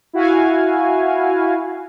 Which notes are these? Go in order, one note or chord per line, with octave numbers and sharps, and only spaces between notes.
E4 F#4 F5 G#5